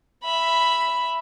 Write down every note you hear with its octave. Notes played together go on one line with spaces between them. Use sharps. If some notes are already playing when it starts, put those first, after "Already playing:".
E5 B5